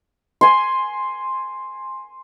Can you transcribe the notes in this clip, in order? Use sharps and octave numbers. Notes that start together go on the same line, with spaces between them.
G#5 C6